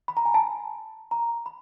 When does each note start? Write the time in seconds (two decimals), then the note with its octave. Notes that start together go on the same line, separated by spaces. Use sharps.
0.08 B5
0.17 A#5
0.25 G#5
0.34 A5
1.11 A#5
1.46 B5